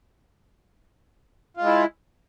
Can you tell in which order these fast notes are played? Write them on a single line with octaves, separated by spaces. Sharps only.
F4 G#3 E4